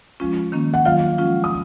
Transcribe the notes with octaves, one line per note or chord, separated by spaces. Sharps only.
F3 G#3 C#4 F4
D#3 A#3 C#4
F#5
D#3 F#3 A#3 F4 F5
F3 G#3 C#4 F4
D#6